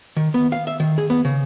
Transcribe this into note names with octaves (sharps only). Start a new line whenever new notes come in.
D#3
B3
F5
E5
D#3
G#4
B3
C#3